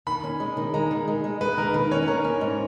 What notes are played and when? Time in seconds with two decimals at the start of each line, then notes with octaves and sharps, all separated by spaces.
0.07 D#3 B5
0.24 C#4
0.40 G#3
0.57 D#3
0.74 G#3 A#5
0.91 D#3
1.08 G#3
1.24 G#3
1.41 G#3 B4
1.57 D#3 A#4
1.74 D#3 B4
1.91 C#4 C#5
2.08 D#3 A#4
2.24 C#4
2.41 G#2